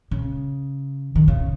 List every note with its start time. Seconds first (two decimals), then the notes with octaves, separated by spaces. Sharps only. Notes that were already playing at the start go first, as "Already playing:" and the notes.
0.11 C#3
1.15 D#3
1.28 C#3